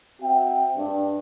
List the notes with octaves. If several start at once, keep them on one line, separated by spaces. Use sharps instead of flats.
C4 F#4 E5 G5
G2